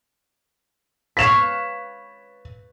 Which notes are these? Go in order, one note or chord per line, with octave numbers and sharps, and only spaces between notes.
B4 C#5 F5 B6 E7